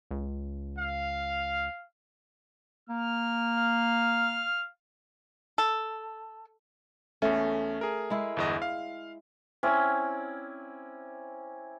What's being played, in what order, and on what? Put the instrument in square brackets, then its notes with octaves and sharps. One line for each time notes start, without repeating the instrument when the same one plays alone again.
[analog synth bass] C#2
[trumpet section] F5
[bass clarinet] A#3 [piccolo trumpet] F6
[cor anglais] F5
[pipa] A4
[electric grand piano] E2 C#4 [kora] A3
[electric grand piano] G#4 A#4
[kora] G#3 E4
[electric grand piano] G1 E2 D#5
F5
[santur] C4 C#4 E4 D5